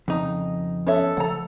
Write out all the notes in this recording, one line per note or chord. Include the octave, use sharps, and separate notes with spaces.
F2 C#3 D#4
B3 C#4 A4 C#5 E5
C#3 F3 A3 F#5 A#5